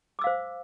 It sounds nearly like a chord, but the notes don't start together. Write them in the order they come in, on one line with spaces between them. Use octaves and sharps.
D6 E6 F5 C5